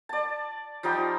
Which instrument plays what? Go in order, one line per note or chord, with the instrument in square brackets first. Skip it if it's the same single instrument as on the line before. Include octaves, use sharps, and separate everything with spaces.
[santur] D5 A5
F3 G3 D#4 G5